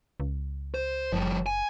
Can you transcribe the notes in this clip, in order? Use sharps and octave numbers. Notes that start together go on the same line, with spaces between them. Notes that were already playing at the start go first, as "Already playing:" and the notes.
C#2
C5
F#1 F3 G3
G#5